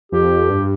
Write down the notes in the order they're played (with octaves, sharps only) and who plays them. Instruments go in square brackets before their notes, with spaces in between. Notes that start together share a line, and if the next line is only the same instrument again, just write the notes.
[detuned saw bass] F2 [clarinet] G4
[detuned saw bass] G2